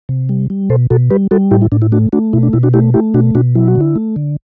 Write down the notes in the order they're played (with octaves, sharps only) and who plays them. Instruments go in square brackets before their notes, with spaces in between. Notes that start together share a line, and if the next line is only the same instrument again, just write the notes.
[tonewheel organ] C3
G3
G3
B2 A4 C5
B2 F#4 A4
G3 G4 B4
G3 F#4 A4
A2 E4 G4
E4
A2 D4
E4
A3 D4 F#4
A3 D4 F#4
B2 E4
D4
B2 E4
D4 F#4
A3 E4 G4
A3 E4 G4
B2 D4 F#4
B2 D4 F#4
F#3 E4
F#4
D3
E4
A3
D3